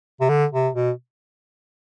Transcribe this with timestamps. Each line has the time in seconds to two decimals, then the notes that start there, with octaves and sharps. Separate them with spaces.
0.21 C3
0.29 D3
0.53 C3
0.75 B2